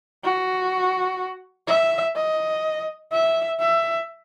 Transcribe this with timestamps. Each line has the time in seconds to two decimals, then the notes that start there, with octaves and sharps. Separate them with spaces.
0.24 F#4
1.68 E5
2.16 D#5
3.12 E5
3.60 E5